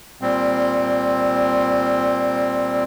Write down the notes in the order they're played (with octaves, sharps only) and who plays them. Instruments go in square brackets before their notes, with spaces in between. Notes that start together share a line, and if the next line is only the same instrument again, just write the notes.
[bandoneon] A#2 G3 C4